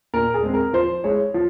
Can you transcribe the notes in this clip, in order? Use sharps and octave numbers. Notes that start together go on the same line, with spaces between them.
A#2 A#4
G#4
G#3 C4
A#4
F3 C5
G#3 E4 C#5
F3